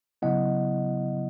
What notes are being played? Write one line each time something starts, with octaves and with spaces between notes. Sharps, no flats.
C#3 F#3 B3 E4 D#5 F#5